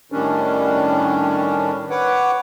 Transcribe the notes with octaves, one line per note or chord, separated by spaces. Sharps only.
A2 D#3 G3 C#4 D4
B4 C#5 F#5 D6